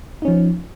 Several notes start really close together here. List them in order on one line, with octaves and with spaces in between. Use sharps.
D#4 C#4 F3